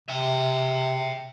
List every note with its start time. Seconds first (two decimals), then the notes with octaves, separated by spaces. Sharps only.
0.08 C3 E5 G5